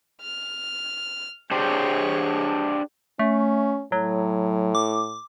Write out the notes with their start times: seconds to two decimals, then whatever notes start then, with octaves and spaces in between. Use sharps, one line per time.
0.22 F6
1.51 D4 G4 G#4 C5 C#5
3.19 A3 C#4
3.92 A2 F#3
4.75 D6